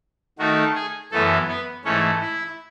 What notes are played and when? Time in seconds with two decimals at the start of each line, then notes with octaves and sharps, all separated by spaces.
0.39 D#3 A3 D#4 F#4
0.75 G#4
1.12 F#2 E3 A3 B3 E4 A4
1.48 B3 B4
1.85 G#2 E3 A3 C#4 C#5
2.21 E4 E5